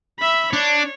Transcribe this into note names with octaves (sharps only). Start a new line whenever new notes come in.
E5 B5
D4 C#5